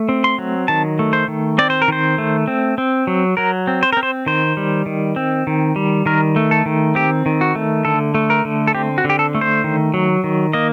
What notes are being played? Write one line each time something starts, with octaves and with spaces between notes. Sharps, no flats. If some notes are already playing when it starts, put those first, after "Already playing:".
Already playing: A3
C4
C6
F#3
D#3 A5
A3
C5
D#3
C4 D5
C5
A#4
D#3 C5
A3
C4
C4
F#3
F#3 A#4
C4
C5
C4 A#4
C5
D#3 C5
G3
D#3
C4
D#3
G3
D#3 A#4
A3
A4
D#3
C4 G4
D#3
F#4
A3
D3 A4
A3
A#4
D3
A4
C4 G4
F#4
D3
G4
A4
A3
C5
D#3
F#3
D#3
A#3 D#5